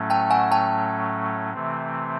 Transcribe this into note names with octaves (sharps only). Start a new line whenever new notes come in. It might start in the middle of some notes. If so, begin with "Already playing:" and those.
Already playing: A2 F#3 A3 C#4
G5 A5
F#5 G#5
G5 A5
C3 E3 A3 C4